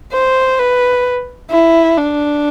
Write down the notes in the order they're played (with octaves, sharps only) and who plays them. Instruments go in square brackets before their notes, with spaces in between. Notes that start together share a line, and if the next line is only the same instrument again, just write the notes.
[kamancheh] C5
B4
E4
D4